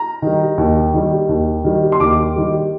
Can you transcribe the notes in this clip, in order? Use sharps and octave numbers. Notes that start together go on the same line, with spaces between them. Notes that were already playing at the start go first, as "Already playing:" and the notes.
Already playing: A#5
D#3 G3
D#2
D#3 G3
D#2
D#3 G3
C6
D#2 D6
D#3 G3